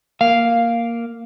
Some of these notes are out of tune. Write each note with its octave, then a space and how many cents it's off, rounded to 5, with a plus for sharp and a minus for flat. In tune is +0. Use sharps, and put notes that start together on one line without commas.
A#3 +0 F5 +0